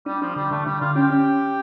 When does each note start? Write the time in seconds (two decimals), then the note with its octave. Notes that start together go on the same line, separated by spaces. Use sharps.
0.06 G3 D4
0.21 F3 D4
0.36 D3 G3
0.51 D3 A3
0.66 D3 G3
0.81 D3 F4
0.96 C#4 G4
1.10 C#4